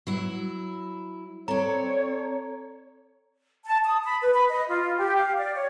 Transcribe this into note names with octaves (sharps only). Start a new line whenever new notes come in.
F#3 E4
C4 A4 C#5 D5 A#5
A5
D#6
B5
B4
B5
D#5
F4
G4
F5
D5
C#5